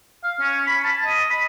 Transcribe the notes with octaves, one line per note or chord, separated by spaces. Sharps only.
F5
C#4
B5
A5
D#5
B5